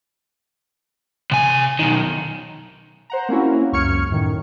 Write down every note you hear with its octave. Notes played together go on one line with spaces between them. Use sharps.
C3 G#5
B1 D#3
C5 F#5 A#5
A#3 C4 C#4 E4 F#4
C#2 F#2 C#6 F6 G#6 C#7
F#2 A2 D#3